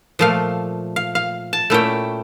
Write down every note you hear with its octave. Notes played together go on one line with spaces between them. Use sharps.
A#2 F3 A3 F5
F5
F5
A5
A#2 A3 C#4 E4 G5